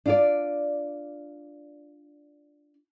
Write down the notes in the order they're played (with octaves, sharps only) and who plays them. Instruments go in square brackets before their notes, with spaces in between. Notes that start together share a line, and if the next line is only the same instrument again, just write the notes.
[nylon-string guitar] D4 F4 D5